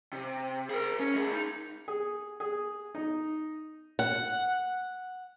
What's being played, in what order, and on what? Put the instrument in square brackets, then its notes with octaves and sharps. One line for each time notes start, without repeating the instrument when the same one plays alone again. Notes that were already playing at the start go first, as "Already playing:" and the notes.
[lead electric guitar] C3
G#4 A#4
C#4
D2 G#4
D#4
[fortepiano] G#4
G#4
D#4
[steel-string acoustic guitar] F#5